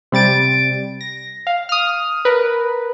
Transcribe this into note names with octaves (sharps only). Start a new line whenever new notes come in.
C3 G3 A6 D7
A#6
F5
D#6 F6
A#4 B4